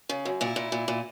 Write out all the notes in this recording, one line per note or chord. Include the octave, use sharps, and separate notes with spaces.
C#3
F#2
A#2 E4
A#2
A#2
A#2